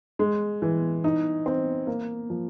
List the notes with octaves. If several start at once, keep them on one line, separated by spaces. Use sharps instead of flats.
G#3
E3
D#4
C4
A#3
F3